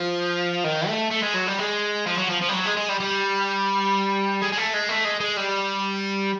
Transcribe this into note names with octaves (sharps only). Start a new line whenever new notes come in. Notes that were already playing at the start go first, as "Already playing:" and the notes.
Already playing: F3
D#3
A3
A3
G#3
F#3
G3
G#3
F3
F#3
F3
F3
G3
F#3
G#3
G#3
G3
G3
G#3
G#3
A3
G#3
A3
G#3
G#3
G3